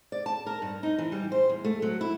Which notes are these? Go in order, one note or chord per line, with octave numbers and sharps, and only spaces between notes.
D5
A5
A#4
G2
D#4
E3
G3
C5
E2
A3
F#3
E4